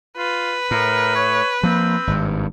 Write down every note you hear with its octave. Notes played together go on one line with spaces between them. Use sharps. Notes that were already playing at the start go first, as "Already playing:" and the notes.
F4 B4
A2 A#4
C#5
F3 A#3 C4
G#1 G2